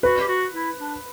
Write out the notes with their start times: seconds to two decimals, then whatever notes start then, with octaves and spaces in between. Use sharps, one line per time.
0.03 F#4 B4
0.20 G4
0.28 F#4
0.53 E4
0.79 D4